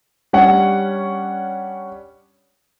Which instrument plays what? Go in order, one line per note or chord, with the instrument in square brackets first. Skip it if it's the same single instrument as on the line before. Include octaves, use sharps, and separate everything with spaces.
[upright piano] G3 C#4 D4 C#5 F#5